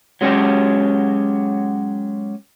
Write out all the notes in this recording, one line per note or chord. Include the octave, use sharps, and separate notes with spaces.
F#3 G#3 C#4 F#4 G4